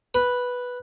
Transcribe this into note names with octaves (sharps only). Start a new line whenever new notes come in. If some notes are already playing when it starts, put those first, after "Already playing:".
B4